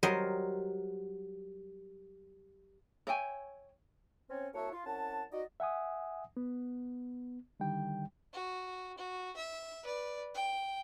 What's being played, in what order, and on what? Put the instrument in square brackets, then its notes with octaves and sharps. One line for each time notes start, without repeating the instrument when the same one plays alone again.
[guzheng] F#3 G3 A#4 C5 D#5
[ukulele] C#5 E5 G5 G#5
[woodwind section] C4 C#4 C#5
C2 A#3 F#4 C#5 E5 A5
F4
C2 C#4 F#5 A5
D#4 F#4 D5 D#5
[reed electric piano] E5 F#5 G#5 D#6
B3
D3 D#3 G3 G5
[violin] F#4
F#4
E5
B4 D5
G5